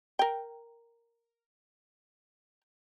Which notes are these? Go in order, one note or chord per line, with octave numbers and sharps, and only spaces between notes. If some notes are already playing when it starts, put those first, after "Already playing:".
A#4 G5